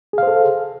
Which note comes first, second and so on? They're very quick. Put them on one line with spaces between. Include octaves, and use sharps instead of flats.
G#4 F5 C5 A4